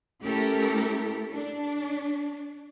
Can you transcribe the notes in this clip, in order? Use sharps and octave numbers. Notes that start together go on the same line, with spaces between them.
A3 C#4 E4 G4 A4 A#4
D4